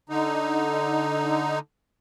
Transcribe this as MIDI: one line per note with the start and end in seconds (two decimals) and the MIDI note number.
0.09 1.59 50
0.09 1.59 63